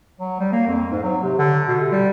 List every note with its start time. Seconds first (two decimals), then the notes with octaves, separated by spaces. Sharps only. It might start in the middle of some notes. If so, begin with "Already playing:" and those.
0.20 F#3
0.39 G3
0.52 A#3
0.67 F2
0.91 G#2
1.03 F#3
1.23 C3
1.38 D3
1.68 B2
1.80 C3
1.91 G3